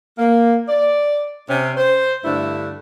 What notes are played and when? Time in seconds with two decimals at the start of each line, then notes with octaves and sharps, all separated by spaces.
0.18 A#3
0.68 D5
1.49 C3 C#4
1.77 C5
2.24 G2 D3 A3 E4 E5